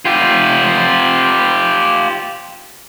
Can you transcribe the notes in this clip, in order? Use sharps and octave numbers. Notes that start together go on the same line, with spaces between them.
F4 G4